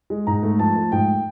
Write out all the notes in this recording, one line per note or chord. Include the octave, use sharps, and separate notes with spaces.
G#3
G#2 A#5
A3
F3 A5
A3
G#2 G5